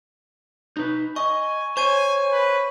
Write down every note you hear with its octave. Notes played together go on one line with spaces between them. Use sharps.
D#4 B4
D#5 G#5 C#6
C5 C#5 G#5 C#6 G#6 D#7
B4